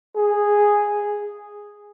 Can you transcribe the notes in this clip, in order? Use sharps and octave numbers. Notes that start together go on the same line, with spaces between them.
G#4